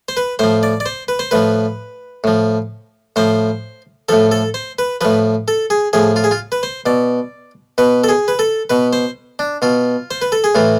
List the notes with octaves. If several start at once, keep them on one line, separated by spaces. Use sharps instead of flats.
C5
B4
A2 F3 C5
D5
D5
C5
B4
C5
A2 F3 B4
A2 F3
A2 F3 C5
A2 F3 A4
A4
C5
B4
A2 F3 B4
A4
G#4
A2 F3 G#4
F4
G#4
F4
B4
C5
B2 D5
B2 B4
A4
G#4
B4
A4
B2 B4
C5
D4
B2 F4
C5
B4
A4
G#4
A2 E3 F4